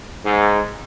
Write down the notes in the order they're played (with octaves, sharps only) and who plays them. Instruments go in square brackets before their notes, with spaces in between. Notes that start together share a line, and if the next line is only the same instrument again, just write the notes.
[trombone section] G#2